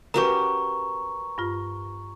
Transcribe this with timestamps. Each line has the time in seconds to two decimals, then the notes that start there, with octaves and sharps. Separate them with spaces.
0.14 C#4 F#4 G4 A#4 B4 A#5 C#6
1.38 G2 F4